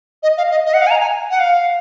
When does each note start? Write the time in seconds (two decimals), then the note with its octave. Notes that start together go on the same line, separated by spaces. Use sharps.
0.23 D#5
0.38 F5
0.51 D#5
0.66 D#5
0.74 F#5
0.81 F5
0.86 G#5
0.91 A#5
1.01 G#5
1.31 F#5
1.40 F5